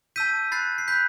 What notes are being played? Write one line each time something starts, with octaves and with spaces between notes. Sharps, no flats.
A5 E6 G6 B6 D#7
B5 F#6 A6 C7
C7
B5 F#6 G6 B6